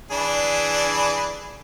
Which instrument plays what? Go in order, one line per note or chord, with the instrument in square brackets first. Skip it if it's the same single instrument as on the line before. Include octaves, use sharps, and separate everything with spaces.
[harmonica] E3 D4 G#4